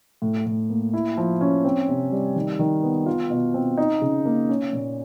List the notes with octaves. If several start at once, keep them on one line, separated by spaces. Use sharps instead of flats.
A2
A2
A#3
E4
F3
C#4
C4
C3
G3
D#3
D#3
B3
F4
B2
C4
D#4
C#3
A#3
C#4
A#2